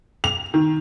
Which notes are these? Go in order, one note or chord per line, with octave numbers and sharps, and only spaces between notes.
F7
D#3